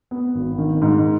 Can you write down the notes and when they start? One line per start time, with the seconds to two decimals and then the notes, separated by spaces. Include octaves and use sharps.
0.11 B3
0.35 G#1
0.58 D#3
0.82 G#2